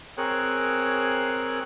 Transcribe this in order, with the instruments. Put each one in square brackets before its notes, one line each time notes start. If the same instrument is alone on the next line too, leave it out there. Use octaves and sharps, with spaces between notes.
[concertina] C4 G#4 A#4 C#5 F#6